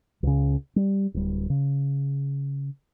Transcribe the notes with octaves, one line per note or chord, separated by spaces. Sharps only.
C#2 C#3
G3
D1 G3
C#3